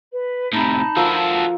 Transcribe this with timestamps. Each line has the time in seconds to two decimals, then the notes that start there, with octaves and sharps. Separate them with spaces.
0.12 B4
0.53 A2 C3 D#4 A5 B5
0.97 F3 F#4 A4 A#4 E6